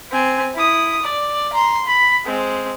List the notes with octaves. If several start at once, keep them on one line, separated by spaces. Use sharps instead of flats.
C4 G#5
E4 D#6
D5
A#5 C6
B5
G#3 C4